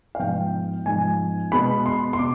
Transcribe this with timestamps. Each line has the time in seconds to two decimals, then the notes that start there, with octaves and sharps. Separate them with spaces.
0.15 F5
0.19 G#2 F3 B3 G5
0.86 G#2 F3 B3 G#5
1.52 B2 G#3 B3 B5
1.86 C6
2.13 C6
2.19 B2 D6